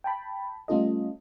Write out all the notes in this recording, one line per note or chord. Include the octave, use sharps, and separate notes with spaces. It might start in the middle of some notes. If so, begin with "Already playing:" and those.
G5 A5 B5
G3 A3 C#4 F4 A4 D#5